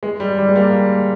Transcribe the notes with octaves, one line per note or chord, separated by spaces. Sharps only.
G#3
G3
G3
G#3
G3 A#3